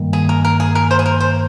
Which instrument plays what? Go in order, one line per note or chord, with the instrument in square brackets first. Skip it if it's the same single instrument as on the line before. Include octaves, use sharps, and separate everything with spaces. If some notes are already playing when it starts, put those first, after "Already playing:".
Already playing: [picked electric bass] G2 D#3 G3 A#3
[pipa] G#4
A#4
A#4
G#4
A#4
C5
G#4
A#4
C5